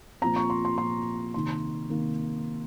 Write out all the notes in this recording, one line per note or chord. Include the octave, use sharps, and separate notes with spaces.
A#2 F3 C4 A#5
C#6
C6
C6
A#2 F3 C4 C6
C3 D#3 A#3 D#4 C6
C3 D#3 A#3 D#4